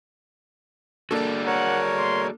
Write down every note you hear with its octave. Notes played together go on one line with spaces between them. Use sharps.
A#3 D4 F#4 G#4 A4 D5
A#4 C#5 F#5
C6